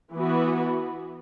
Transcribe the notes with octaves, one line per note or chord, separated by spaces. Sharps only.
E3 B3 F#4